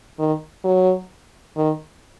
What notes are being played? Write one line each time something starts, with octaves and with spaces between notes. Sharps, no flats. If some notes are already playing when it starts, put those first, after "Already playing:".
D#3
F#3
D#3